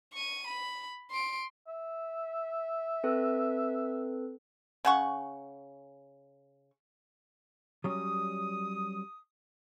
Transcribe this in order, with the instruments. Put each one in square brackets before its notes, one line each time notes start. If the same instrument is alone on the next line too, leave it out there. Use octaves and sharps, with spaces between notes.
[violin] C#6 D#7
B5
C6 D7
[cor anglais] E5
[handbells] C4 A4 B4
[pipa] C#3 F#5 C#6
[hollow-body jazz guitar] F#3 G3 C#4 [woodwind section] D#6